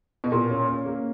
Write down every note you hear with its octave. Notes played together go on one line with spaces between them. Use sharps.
B2
A#2 A#3
C#4
C#4
A#3